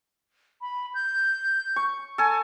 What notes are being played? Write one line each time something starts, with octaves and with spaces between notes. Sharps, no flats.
B5
G6
C#6
A4 G#5